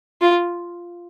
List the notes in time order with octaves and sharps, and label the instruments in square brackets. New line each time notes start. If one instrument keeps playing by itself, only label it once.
[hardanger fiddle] F4